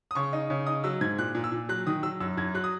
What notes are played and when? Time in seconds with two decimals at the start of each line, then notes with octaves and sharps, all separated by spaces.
0.11 D#6
0.15 C#3 C#6
0.33 D#4
0.50 C#3
0.67 D#4 D#6
0.84 F#3 E6
1.01 G#2 G#6
1.18 A#2 F#6
1.35 A#2
1.44 E6
1.52 A#2
1.69 F#3 F#6
1.86 D#3 D#6
2.03 F#3 E6
2.20 F#2 E6
2.37 F#2 G#6
2.54 F#3 F#6
2.64 D#6